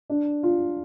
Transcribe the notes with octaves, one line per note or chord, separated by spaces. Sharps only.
D4
F4